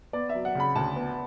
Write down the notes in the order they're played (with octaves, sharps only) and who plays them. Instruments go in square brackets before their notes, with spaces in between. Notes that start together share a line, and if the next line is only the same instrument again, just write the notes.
[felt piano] B3 [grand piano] D5
[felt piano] F#3 [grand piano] E5
[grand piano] F#5
[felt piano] C#3 [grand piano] B5
[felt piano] D2 [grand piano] A5
[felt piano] B3